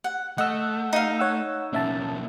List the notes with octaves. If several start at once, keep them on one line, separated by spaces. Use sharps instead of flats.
F#5
A3 D#5 F#5 E6
D#4 F5
C#5 F#5 E6
B1 A#3 C#4 E5 A5